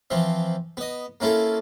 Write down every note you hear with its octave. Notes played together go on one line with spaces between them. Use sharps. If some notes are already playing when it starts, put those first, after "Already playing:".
E3 F3 C4
B3 D#5
A#3 C#4 E4 F4 A4